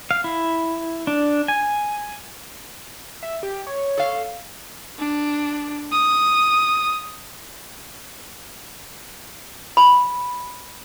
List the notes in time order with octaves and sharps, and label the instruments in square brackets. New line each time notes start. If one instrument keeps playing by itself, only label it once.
[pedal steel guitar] F5
E4
D4
G#5
[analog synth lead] E5
G4
C#5
[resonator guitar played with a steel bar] A4 F5
[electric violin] D4
D#6
[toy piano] B5